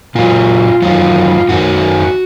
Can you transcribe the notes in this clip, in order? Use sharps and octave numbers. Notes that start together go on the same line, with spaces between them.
A#2 F#3 F4
F#2 D#3 F#3 F4
F#2 D#3 F#3 F#4